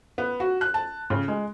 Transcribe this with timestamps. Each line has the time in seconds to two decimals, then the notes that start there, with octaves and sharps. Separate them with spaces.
0.18 B3
0.40 F#4
0.61 F#6
0.74 A5
1.10 C#3
1.28 G#3